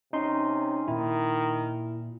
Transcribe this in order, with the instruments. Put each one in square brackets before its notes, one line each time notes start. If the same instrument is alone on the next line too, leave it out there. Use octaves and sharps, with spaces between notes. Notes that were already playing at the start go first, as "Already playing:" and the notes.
[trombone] C3 [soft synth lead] C#4 [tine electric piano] D#4 C6
[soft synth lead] A#2 [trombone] D#3 [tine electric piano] E4